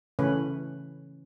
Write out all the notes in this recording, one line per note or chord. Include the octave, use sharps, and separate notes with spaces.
C#3 E3 A3 C#4 B4 C#5